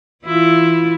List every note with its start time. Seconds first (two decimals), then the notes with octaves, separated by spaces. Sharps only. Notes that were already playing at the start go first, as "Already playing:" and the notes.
0.25 E3 E4 F4